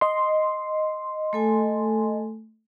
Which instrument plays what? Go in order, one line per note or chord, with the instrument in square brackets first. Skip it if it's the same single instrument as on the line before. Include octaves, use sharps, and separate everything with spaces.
[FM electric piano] D#5 C6
[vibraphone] A3 A4 G#5